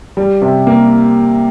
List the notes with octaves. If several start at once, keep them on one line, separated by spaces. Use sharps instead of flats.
G3
C3
A#3